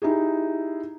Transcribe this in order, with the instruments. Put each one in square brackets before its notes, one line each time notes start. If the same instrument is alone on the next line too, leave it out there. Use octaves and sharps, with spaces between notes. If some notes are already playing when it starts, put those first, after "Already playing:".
[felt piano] D#4 E4 G4 G#4